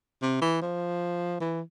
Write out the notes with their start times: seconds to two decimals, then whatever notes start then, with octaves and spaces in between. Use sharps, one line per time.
0.22 C3
0.42 E3
0.62 F3
1.40 E3